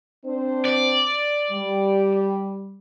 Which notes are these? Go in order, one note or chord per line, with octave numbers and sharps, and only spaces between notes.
C4 D4 C5
D5
G3